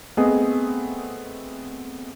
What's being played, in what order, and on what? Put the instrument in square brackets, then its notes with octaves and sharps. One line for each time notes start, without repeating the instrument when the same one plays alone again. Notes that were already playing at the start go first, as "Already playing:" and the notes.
[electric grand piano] A3 B3 C4 G#4 D#5